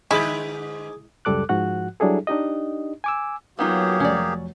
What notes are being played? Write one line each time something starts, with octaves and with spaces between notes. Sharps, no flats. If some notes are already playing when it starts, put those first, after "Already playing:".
G#2 D3 G#3 E4 G#4 B4 D6
C#2 F#2 G3 A4 D6 F#6
G#2 F3 F#4 F#5 F#6
F#3 G3 D4 E4 G#4 A4
D4 D#4 G4 D#5
G#5 D6 E6
F#3 A#3 B3 D#4 F4 G4 G#4
F1 C#4 D5